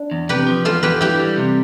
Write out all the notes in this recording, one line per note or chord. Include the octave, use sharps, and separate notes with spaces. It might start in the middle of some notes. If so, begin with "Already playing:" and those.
Already playing: D4
E2
C3 G4 B4
F3
E2 F4 A4
E2 G4 B4
E3 E4 G4
G3
C3